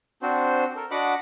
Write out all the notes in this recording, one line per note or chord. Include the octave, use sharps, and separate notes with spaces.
C4 D4 F#4 C5
A4 A#4
D4 F#4 D#5 F#5 B5 D6